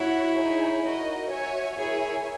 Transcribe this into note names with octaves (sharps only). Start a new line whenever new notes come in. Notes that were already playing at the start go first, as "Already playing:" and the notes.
Already playing: E4 F#4 C#5 F#5
D#4 G#4 C#5
D#4 F#4 A#4 D#5
F#4 C#5 E5 G#5
E4 G#4 A#4 C#5 E5 G#5